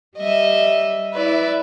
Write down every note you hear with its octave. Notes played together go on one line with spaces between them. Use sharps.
G3 D#5 E5
E4 B4 D5 E5